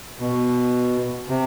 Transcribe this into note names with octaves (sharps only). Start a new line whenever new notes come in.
B2
C3